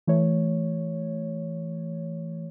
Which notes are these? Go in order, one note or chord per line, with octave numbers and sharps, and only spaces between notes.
E3 A3 C#5